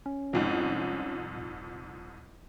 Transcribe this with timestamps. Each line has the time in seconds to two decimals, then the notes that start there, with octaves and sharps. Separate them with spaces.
0.06 C#4
0.33 C2 F2 G#2
1.34 D#1